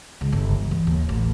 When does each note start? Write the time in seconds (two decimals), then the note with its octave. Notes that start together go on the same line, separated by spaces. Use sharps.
0.21 C#2
0.32 G1
0.52 E3
0.71 E3
0.87 D#2
1.09 A1